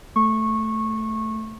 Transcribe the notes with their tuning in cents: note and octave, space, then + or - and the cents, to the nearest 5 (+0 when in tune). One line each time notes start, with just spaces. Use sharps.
A3 +0 C#6 -20